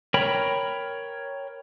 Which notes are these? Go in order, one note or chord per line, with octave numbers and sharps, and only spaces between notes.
A#4 C#5 G5 B5